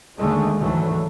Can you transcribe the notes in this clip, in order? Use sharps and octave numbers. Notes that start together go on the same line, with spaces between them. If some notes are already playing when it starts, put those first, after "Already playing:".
D#2 D3 G#3 A3
D2 G#2 E3 F#3 A3